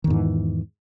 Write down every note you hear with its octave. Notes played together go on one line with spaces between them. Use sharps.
E2 G#2 D#3 E3